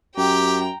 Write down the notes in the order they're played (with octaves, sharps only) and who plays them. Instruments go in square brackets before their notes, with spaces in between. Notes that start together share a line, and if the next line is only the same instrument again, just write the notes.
[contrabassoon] F#2 [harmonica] G4 [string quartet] G5 A#5